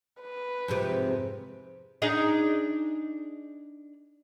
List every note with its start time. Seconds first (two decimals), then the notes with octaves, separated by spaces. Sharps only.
0.21 B4
0.68 F2 G#2 C3
2.02 D4 D#4 G#4